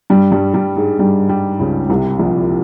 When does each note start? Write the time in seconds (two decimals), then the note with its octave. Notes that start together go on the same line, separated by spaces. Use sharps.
0.10 G2 G3
0.32 G2 G3
0.54 G2 G3
0.77 G#2 G#3
0.99 G2 G3
1.29 G2 G3
1.59 C#2 C#3
1.90 C2 C3
2.19 A#1 A#2